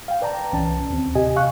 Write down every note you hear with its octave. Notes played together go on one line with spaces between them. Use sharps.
F5 G5
B4 D5 G5 A5 A#5
C2 E3 C#4 A5
D#2 C4
C3 G4 D#5 G#5
F5 C#6 F#6